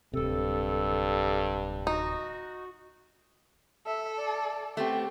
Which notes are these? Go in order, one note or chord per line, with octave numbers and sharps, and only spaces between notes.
D1 G2 C3 A4
D#4 F#4
A4 E5
D5
A3 B3 C4 G4